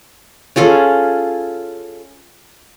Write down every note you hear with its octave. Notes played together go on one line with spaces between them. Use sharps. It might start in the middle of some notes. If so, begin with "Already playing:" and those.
C#4 F4 G#4 A4